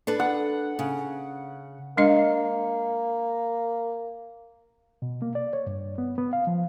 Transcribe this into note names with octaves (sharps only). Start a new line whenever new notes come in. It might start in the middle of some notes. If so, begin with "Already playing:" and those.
D4 A4 B4
F#5
C#3
G#3 A#3 D4 D#5
B2
A#3
D5
C#5
G2
B3
B3
F5
F3